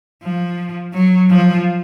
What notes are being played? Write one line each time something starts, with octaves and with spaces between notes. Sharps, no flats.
F3
F#3
F3